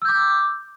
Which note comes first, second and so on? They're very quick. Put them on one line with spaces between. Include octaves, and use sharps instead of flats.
E6 G6 D6